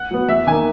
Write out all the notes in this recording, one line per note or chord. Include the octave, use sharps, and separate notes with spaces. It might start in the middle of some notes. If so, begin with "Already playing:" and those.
Already playing: F#5
F#3 B3
E2 E5
D#3 A#3 G#5